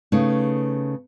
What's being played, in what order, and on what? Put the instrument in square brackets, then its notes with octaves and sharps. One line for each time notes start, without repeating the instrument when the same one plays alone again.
[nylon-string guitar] C#3 A3 B3 D#4